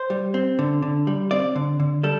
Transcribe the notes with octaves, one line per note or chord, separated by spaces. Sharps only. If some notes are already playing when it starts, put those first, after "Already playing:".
Already playing: C5
G3
C4
D3
D3
G3
C4 D5
D3
D3
G3 A4